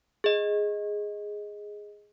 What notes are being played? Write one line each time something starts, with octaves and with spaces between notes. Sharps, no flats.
G#4 D#5